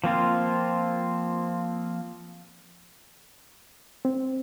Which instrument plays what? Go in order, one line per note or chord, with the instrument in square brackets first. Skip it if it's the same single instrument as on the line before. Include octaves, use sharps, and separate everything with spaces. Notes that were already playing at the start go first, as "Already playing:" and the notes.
[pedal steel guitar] F3 A#3 C4 F4
[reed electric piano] C4